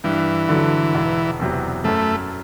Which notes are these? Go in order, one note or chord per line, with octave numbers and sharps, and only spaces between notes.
G2 E3
D3 F#3
E1
E2 C3 F#3
F#2 A3